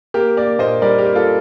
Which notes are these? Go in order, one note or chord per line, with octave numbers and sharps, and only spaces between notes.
A#3 G4 A#4
A#3 A#4 D5
A#2 C5 D#5
G3 A#4 D5
G4 A#4
A#3
F4 A4